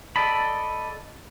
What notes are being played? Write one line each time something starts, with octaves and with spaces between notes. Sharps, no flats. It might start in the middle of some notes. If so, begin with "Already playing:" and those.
A4 D5 D#5 A5 B5